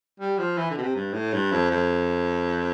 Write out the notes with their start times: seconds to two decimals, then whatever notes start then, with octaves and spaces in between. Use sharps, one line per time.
0.20 G3
0.38 F3
0.58 E3
0.70 D3
0.77 B2
0.82 C3
0.95 G2
1.14 A2
1.33 G2
1.52 F2
1.70 F2